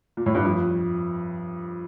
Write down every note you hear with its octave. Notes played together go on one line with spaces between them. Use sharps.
A#2
A2
G2
F2